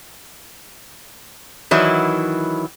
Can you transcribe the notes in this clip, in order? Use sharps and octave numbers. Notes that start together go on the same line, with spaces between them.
D#3 E3 F#3 E4